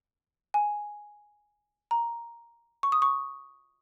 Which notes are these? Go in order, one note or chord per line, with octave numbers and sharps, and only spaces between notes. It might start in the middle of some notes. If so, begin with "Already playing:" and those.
G#5
A#5
C#6
D#6
C#6